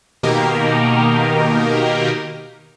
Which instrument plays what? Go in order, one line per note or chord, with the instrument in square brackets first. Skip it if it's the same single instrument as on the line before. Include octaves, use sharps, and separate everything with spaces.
[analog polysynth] B2 D#3 A#3 D#4 G4 A#4